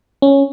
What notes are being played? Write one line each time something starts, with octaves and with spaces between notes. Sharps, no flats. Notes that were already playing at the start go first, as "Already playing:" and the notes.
C#4